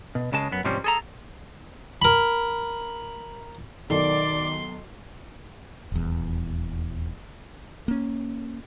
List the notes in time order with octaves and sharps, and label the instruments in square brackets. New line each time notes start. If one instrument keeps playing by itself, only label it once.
[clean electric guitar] B2
C#2 C#3 G#3 A5
F#2 B3
G#2 C3 F3 G3 C4 C#4
G#4 A4 A#5
[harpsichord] A#4 B5
[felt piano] B1 A4 [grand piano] D#3 [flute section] D5 D6 [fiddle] C6
[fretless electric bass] D#1 E2
A#3 C#4